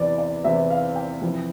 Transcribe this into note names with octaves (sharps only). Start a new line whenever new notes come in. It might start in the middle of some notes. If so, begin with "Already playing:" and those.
Already playing: E2 C3 E3 D5
D5
E2 C3 E3 E5
F5
G5
F2 C3 E3